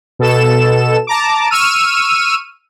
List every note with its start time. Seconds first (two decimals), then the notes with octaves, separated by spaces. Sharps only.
0.19 B2 A4 E7
1.07 A5 A#5 D6
1.50 C#6 E6 F6 D#7